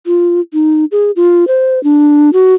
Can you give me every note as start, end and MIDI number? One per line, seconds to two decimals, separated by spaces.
0.06 0.40 65
0.53 0.85 63
0.92 1.11 68
1.16 1.47 65
1.48 1.82 72
1.84 2.30 62
2.33 2.54 66